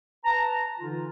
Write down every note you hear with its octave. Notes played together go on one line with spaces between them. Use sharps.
B4 A5 A#5
D3 E3 D#4 F4